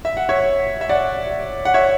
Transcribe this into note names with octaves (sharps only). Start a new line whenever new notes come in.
E5
F#5
C#5 E5
E5
D5 F#5
F#5
C#5 E5